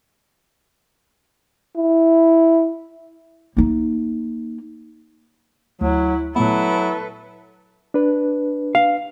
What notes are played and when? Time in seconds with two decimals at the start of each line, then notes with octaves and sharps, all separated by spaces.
1.76 E4
3.57 A#3 D#4
5.81 D2 F#3 E4
6.36 A#2 F#3 A3 B3 E4 A4 B4
7.94 D4 B4
8.75 F5